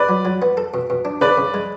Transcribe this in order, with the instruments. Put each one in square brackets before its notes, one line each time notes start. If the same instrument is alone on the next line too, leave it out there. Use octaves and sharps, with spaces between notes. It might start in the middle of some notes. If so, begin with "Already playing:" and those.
Already playing: [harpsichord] C#3 [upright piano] B4 D5
[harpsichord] F#3
F#3
B3
A4
B2
B2
D4
[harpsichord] C#3 [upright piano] B4 D5
[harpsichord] C#3
G#3